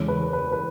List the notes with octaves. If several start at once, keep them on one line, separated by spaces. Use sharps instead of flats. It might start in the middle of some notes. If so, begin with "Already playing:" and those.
Already playing: E2 C#3 G#3
B4
B4
B4